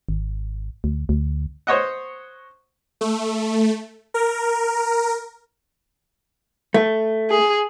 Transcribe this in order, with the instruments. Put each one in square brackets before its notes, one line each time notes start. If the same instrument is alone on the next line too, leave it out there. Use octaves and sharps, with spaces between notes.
[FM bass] G#1
D2
D2
[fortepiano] C5 C#5 D#5 F#5
[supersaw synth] A3
A#4
[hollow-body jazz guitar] A3
[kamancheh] G#4